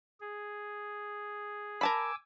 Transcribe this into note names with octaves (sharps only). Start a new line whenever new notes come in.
G#4
A#4 G#5 A5 B5 D6 E6